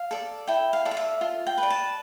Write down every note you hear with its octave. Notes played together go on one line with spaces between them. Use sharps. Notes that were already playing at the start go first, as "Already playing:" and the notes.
Already playing: F5
A4 D5
E4 G5
F5
A4 D5
F5
E5
F4
G5
B4
D5
A5